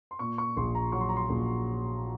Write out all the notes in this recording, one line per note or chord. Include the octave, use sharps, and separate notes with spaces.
C6
A#2 C#6
C#6
A#1 C6
A#5
F#3 C#6
C6
A#5
C6
A#1